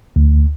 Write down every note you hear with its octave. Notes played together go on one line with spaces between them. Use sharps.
D2